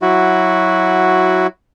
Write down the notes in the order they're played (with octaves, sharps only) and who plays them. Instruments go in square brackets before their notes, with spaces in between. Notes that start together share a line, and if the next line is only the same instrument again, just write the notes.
[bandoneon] F#3 E4 F#4